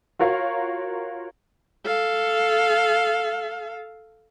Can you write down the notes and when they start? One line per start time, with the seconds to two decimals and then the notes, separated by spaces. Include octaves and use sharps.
0.19 F4 F#4 A#4 C#5 F5
1.85 A4 F5